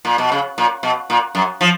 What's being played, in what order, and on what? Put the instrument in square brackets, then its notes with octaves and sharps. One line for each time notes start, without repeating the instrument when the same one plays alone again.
[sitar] A#2
B2
C#3
A#2
B2
A#2
F#2
F3